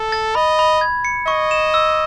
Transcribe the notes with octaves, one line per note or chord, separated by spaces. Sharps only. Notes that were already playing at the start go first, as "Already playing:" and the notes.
Already playing: A4
A6
D#5 B5
B5
G#6
C#7
D#5 C#6
E7
E6